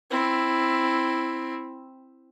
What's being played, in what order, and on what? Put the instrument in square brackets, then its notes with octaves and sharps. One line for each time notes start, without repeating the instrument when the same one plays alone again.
[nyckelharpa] C4 E4